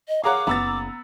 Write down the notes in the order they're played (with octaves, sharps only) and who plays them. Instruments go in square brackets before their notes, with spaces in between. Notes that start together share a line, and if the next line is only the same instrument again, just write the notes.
[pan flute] D#5
[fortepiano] G#4 A#4 F#5 [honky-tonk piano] C#5 F5 [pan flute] D6
[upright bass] F#1 A#3 [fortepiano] B3 [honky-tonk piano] A#5 E6 A6